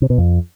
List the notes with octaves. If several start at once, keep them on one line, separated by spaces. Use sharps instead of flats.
C3
B2
F2